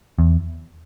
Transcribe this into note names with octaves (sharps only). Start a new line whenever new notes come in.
E2